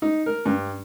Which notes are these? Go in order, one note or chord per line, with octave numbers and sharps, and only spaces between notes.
D#4
A#4
G2